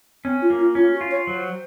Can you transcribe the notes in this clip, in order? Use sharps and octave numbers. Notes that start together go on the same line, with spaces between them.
C4 C#4
F4
A#3
F4
C#4 F4
F#4
F4
C#5
F#3 C5